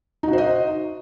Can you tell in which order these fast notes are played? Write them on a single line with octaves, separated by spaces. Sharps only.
D#4 F#4 C5 D#5